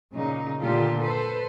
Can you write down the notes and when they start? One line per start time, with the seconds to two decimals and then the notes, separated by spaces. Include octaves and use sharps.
0.14 A#2 C#3 D#4
0.61 A#2 D3 F4 G4 A4
1.00 A4 B4 C5